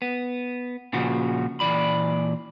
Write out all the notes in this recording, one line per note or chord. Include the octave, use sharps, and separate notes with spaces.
B3
A#2 C#3 F3 F#4
A#2 E3 D5 B5